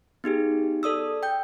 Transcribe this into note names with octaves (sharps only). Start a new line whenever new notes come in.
B3 D#4 G4 G#4
A4 D5 D#6 E6
G5 G6